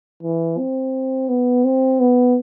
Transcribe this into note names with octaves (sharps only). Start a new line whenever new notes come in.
E3
C4
B3
C4
B3